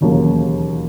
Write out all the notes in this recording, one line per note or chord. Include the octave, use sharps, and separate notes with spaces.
E1 D#2 C#3 F#3 A#3